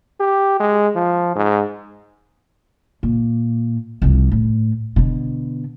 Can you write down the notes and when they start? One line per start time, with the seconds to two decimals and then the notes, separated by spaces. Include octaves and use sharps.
0.20 G4
0.60 G#3
0.95 F3
1.36 G#2
3.03 A#2
4.02 C2 F3
4.31 A2
4.96 B2 D3